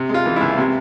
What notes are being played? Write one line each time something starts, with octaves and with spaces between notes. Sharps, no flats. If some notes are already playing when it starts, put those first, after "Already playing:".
Already playing: C3
G#3 F4
E3
C#2 E4
C3